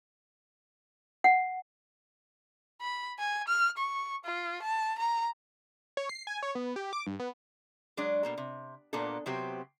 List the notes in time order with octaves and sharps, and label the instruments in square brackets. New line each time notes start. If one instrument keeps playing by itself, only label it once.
[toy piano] F#5
[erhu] B5
G#5
F6
C#6
F4
A5
A#5
[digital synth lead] C#5
C7
G#5
C#5
B3
G4
D6
G2
B3
[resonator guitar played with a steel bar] F#3 G#3 D4 D5
B2 A#3 A4
C3
A#2 A#3 B3 D4 A4
C3 F#3 B3 C4 G4